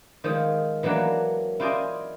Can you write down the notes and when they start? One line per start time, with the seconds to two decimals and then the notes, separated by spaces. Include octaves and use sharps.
0.24 D#3 F3 G#3
0.83 E3 F#3 A#3 D4 F#5 B5
1.60 E4 F4 C5 D5 D#5 G#5